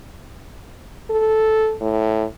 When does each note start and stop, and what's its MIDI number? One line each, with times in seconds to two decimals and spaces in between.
1.10 1.75 69
1.80 2.25 45